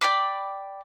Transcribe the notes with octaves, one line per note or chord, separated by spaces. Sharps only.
D5 G5 B5 D6